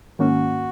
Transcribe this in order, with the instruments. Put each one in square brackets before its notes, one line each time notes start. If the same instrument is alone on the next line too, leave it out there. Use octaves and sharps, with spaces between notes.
[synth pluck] G#2 D#3 A#3 C#4 [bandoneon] F#4